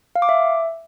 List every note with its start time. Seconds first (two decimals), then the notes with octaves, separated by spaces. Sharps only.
0.16 F5
0.22 D6
0.29 E5